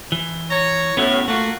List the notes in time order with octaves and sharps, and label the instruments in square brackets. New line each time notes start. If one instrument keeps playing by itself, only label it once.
[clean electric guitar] E3
[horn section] C#5 A#5
[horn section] A2 [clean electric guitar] B3 C#4 F#4
[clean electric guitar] A3 [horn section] A#3 F4 F#4